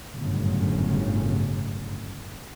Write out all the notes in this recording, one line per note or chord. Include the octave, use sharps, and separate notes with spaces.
G1 F#2 A2 C#3